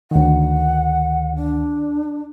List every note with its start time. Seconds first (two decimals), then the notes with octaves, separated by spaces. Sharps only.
0.11 D2 D#3 F#5
1.36 D4